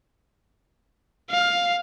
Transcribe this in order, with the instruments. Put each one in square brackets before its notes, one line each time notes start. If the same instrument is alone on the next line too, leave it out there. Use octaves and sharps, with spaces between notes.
[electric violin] F5